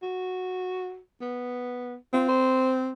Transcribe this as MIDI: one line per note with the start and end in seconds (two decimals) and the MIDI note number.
0.03 0.98 66
1.21 1.95 59
2.13 2.92 60
2.13 2.25 65
2.29 2.75 72